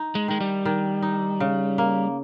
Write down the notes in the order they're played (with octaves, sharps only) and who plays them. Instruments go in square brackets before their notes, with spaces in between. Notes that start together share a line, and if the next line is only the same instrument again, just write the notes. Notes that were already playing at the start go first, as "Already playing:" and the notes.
Already playing: [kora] D#4
[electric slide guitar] G#3
[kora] D#3 [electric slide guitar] G#3
[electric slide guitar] G3
[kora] D#3
D#4
C#3
A#3